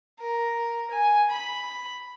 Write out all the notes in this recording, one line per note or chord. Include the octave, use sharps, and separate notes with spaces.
A#4
G#5
B5